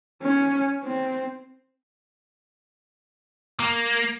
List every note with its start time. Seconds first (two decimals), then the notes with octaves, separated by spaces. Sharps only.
0.23 C#4
0.84 C4
3.60 A#3